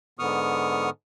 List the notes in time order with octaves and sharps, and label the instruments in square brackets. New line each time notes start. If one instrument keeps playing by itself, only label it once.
[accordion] G#2 D3 B3 C#6 D#6 F6